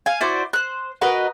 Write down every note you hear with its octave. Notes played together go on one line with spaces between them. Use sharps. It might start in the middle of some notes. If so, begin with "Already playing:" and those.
F5 G#5
E4 F#4 C5 D5
C5 F#6
F#4 A#4 B4 D#5